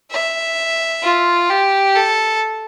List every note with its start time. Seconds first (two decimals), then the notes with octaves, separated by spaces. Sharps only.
0.11 E5
1.03 F4
1.50 G4
1.96 A4